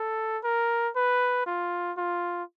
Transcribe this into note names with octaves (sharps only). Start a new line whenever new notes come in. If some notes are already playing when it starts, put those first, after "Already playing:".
Already playing: A4
A#4
B4
F4
F4